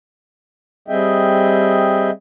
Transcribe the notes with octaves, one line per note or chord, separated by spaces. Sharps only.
G3 C4 G#4 D#5 E5 G5